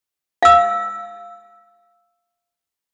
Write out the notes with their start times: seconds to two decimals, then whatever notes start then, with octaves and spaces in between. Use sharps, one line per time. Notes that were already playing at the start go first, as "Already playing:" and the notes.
0.43 F5 E6